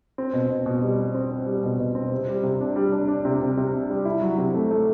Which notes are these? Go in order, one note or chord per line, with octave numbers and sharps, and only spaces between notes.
C4
B2
B2
B2
G3
C4
C4
C4
G3
B2
B2
C4
C3
G3
C3
D4
G3
D4
D4
C3
C3
C3
D4
G3
E4
F#3
C3
A3
A3